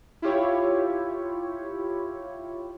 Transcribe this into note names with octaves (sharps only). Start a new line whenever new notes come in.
E4 F4 G4 C#5